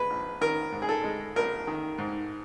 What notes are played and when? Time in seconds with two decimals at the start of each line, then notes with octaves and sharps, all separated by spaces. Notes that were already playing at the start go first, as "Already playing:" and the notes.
Already playing: G#3 B4
0.10 A#1
0.41 D#3 A#4
0.72 G#2
0.82 G#4
0.89 A4
1.04 G#3
1.36 A#1 A#4
1.67 D#3
1.98 G#2